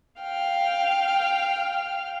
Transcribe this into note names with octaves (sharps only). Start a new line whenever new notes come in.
F5 G5 F6